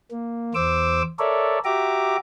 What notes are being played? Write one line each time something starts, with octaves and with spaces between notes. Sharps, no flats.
A#3
E2 C5 D6 E6
A4 A#4 C#5 D5 E5
F#4 G4 E5 A#5 D6